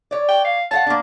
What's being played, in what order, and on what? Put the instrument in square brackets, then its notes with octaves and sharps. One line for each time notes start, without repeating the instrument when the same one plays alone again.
[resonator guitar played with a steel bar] C#5 D5
[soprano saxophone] G5
F5
[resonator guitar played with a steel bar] C#5 F5 F#5 [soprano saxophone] A5
[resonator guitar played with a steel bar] A#3 D4